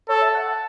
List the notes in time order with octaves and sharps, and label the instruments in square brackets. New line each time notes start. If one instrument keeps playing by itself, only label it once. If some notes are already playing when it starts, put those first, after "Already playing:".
[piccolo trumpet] A4 [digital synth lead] C#5
[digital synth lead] E5
A5
F#5
A5